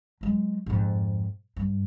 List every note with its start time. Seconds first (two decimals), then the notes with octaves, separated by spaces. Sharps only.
0.21 F#3 G#3
0.66 F2 G#2
1.56 G2